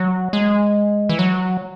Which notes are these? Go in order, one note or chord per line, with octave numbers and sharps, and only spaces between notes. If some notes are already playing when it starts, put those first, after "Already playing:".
Already playing: F#3
G#3
E3
F#3